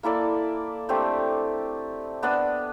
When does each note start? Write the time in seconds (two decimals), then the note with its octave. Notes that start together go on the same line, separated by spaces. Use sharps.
0.03 A#3 E4 A4 D5
0.89 A3 C4 D4 G4
2.23 B3 D4 D#6 E6